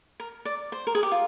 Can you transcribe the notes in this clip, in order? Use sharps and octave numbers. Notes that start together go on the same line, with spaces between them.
A#4
D5
C5
A#4
G#4
G4
F4